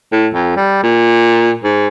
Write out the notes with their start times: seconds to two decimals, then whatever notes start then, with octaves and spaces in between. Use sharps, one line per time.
0.12 A2
0.34 F2
0.56 G3
0.83 A#2
1.63 G#2